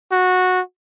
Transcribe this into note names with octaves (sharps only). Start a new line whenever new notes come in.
F#4